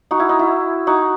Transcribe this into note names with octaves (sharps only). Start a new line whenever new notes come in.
D#4 F#4
E4
D#4
E4
D#4 F#4